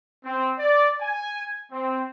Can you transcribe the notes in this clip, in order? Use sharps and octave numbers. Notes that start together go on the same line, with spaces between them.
C4
D5
G#5
C4